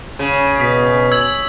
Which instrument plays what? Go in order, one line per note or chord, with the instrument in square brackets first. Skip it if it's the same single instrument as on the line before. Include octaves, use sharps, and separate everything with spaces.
[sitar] C#3
[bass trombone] B2 [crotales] D#6 B6
[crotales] E6 G#6 F#7